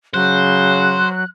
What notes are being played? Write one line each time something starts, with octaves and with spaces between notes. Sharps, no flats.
C#3 F#3 C5 F#6